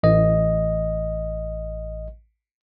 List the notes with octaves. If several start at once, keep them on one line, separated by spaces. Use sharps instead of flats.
A1 D#5